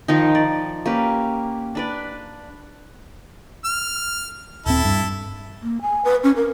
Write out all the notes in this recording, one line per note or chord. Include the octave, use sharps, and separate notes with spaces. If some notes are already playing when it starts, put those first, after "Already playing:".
D#3 F3 D#4
D5
A#3 C#4 G4 B4
D4 B4 D5
F6
D#1 C4 E4 A4
G2
A#3
G#5
B4
C#4
A#4